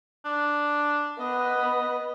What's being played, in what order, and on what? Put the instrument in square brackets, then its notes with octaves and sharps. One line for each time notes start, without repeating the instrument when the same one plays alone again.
[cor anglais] D4
[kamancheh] B3 [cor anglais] D#5